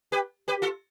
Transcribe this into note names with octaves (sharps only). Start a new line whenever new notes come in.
G4 B4
G4 B4
F4 A4